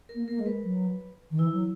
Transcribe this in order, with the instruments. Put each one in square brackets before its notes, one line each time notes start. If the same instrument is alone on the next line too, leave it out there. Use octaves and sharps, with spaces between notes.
[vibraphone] A#4
[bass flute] A#3
[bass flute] A#3 [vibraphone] A#4
[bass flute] G#3
[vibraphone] B4
[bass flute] F#3
D#3
[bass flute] E3 [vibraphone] E4
[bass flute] F#3